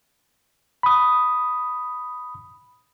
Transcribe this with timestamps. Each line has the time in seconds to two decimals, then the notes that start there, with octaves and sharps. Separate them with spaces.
0.83 B5 D#6